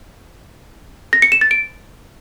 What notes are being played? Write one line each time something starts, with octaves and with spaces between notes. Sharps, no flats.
A#6
C#7
E7
A6
D7